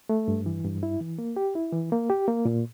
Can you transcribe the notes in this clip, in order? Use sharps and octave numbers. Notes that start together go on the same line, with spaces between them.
A3
G2
E3
G2
E4
E3
A#3
G4
E4
E3
A#3
G4
A#3
A#2